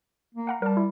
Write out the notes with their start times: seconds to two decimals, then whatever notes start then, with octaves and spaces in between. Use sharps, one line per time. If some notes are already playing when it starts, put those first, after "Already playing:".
0.35 A#3
0.47 F5 F#5 A#5
0.62 G3 A#4 A5
0.77 E4